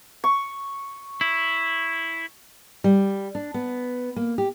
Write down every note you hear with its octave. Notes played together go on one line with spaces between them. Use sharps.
C#6
E4
G3
D4
B3
A#3
G4